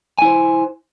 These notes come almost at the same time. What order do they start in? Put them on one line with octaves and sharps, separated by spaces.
G#5 E4 C5